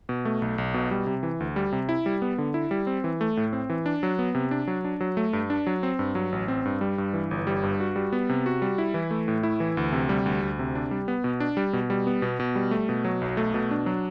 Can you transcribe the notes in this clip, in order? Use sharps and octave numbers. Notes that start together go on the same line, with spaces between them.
B2
A3
B1
B1
B2
G3
C3
E3
D2
G3
C3
E4
G3
B3
D3
E4
G3
C4
E3
A3
A2
C4
E3
D4
F#3
B3
C3
D4
F#3
D4
F#3
A3
G2
D4
F#3
C4
G2
F#3
A1
C4
G2
G3
G2
E3
G1
G3
G2
F#4
G3
B3
C3
F#4
G3
E4
E3
A3
A2
E4
E3
D2
C3
G3
D2
D2
C3
D4
G3
B3
B2
D4
G3
B2
G3
B3
B2
B2
G3
A3
B2
F#3
B1
A3
B2
D4
F#3